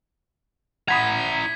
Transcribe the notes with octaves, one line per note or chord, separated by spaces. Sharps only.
E4 F#5 A#5 B5 D#6 G#6 B6